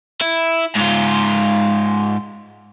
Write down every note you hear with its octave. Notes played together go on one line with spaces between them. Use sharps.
E4
G#2 F4